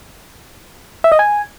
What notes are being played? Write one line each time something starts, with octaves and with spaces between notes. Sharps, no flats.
E5
D#5
G#5